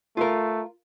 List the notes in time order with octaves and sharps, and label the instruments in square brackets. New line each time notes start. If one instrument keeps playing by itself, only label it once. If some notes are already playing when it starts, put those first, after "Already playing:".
[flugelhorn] A3 [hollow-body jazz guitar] F4 A#4